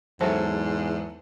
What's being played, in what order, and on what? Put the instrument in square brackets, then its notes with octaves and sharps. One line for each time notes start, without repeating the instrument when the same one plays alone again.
[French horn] E2 [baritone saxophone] G#2 [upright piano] F#3 A4 E5 [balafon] C5